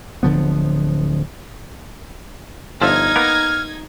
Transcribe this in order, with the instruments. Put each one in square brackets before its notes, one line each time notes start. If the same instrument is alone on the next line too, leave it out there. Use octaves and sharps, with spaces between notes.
[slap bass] D1 D3 F3 B3
[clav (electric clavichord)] G1 F3 E5 [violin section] D#4 G#6 [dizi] F6
[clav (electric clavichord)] A#3 B3 A#4